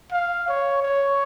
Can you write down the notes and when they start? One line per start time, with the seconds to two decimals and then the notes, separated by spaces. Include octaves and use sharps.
0.12 F5
0.48 C#5
0.83 C#5